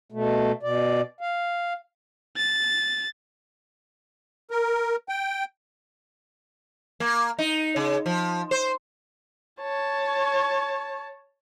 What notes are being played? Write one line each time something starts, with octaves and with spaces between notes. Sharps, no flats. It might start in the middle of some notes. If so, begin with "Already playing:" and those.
B2 A3
B2 D5
F5
A6
A#4
G5
A#3
D#4
C#3
F3
C5
C#5 A5